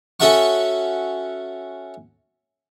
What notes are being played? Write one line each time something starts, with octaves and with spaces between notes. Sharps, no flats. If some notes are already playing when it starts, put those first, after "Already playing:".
C#4 F#4 A4 E5 F#5 C#6